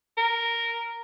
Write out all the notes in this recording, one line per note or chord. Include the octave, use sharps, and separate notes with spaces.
A#4